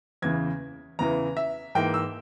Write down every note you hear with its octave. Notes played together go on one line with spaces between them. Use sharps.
E2 C#3 E3 G#6
E2 C#3 E3 A#5
E5
G#2 E3 A#3 G5
E6